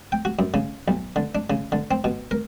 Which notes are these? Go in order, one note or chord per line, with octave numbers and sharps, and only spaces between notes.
G5
F#4
F#2
C#3
B1
D3
D4
C#3
D3
C4
B2
A#4